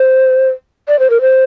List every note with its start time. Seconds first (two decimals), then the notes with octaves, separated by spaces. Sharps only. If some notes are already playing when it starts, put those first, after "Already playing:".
Already playing: C5
0.88 D5
0.99 C5
1.10 A#4
1.21 C5